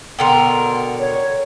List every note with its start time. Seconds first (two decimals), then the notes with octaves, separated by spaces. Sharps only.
0.19 B2 D3 A#4 G5 A#5 C6
1.00 C#5